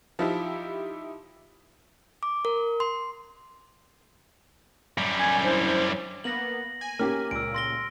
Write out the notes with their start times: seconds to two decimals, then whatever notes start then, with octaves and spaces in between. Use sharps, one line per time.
0.19 F3 D#4 E4 G4
2.23 D6
2.45 A#4
2.80 C6
4.98 F#2 G3
5.19 G#5
5.44 D4 E4 C5
6.24 A#3 B3 A#6 F#7
6.81 G#5
6.99 A#3 C#4 G4 F6
7.31 C#2 A#2 E6 D7
7.54 C6 A#6 G7